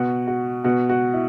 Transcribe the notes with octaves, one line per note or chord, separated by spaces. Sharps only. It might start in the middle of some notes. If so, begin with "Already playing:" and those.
Already playing: B2 F#4
F#4
B2 F#4
F#4
E4